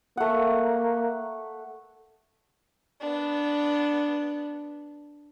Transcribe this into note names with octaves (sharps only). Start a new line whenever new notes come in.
A3 A#3 F#5
B3 D4